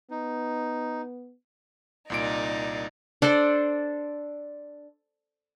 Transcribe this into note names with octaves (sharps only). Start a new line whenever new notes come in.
B3 D#4
C2 A#2 D#4 D5 D7
D4 A4 C5 D5